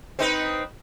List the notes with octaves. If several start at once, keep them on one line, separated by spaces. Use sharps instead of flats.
C4 D#4 B4